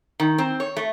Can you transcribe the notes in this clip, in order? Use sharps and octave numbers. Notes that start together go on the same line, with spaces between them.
D#3
C4
C#5
A3